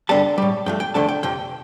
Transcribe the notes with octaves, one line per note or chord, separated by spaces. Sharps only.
G2 D3 G3 A5
A2 G3
G2 F3 A3 G5
G5
D#2 D3 F3 A3 A5
G5
F2 C3 G5